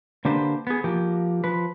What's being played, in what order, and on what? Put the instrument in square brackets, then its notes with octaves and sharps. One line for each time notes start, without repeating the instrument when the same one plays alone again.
[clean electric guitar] D3 A#3 D4 G4 B4 C5
B3 G#4
F3 A#3 F#4 G4
F3 B4